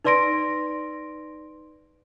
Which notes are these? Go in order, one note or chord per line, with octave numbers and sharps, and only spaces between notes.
D#4 B4 D5 C6 A#6 D7